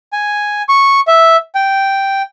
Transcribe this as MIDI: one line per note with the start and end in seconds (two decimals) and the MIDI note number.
0.13 0.62 80
0.69 1.00 85
1.07 1.36 76
1.55 2.22 79